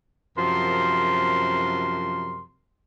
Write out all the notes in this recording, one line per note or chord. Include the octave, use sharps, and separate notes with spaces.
F#2 C3 F3 A#4 C6